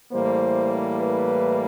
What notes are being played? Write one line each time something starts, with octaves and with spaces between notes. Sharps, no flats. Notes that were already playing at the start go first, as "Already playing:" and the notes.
A2 E3 G3 A#3 C5
B4